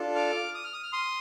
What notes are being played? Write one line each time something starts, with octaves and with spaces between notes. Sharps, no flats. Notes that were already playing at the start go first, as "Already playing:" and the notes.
Already playing: D4 F4 A4
D6 F6
D#6
F6
D#6
F6
C6 D#6